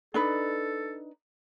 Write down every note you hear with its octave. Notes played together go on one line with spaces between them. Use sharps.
D4 D#4 A4 B4